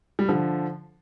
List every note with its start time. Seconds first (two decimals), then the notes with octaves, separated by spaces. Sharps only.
0.19 G3
0.29 D3 F3